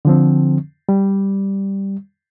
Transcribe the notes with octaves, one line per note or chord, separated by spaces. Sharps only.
D3 F3 C4
G3